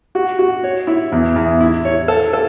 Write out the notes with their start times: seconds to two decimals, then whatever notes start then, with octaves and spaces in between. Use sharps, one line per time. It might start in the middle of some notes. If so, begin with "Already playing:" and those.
0.15 F#4
0.39 F#4
0.64 C#5
0.87 E4
1.12 E2
1.36 E2
1.60 E4
1.85 C#5
2.08 A4
2.33 A4